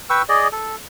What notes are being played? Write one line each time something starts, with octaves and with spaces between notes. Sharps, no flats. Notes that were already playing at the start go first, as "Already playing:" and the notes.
B4 G5 C#6 E6
G#4 D5 D#5
A4